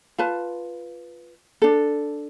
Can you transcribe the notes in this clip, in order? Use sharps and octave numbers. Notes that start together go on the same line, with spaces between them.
F4 B4 A5
D4 A4